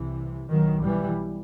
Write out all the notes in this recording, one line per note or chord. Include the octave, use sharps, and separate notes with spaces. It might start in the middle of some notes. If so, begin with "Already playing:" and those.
Already playing: C2 C3 E3
B1 B2 D#3 F#3
E3 G3